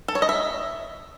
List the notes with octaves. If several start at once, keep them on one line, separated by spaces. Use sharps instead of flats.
A4
C#5
D#5
E5